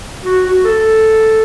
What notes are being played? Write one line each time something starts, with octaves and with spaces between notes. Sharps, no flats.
F#4
F#4
A4